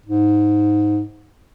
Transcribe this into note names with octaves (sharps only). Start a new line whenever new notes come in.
G#2